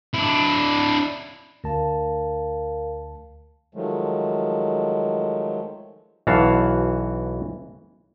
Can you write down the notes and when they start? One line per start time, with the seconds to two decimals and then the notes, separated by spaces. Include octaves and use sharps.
0.15 D4 E4
1.64 D2 A#4 F5 A5
3.75 D#3 F3 F#3 G#3 A3
6.27 B1 E3 F#4 F5 A5